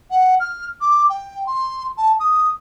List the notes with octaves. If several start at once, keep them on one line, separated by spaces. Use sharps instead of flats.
F#5
F6
D6
G5
C6
A5
D#6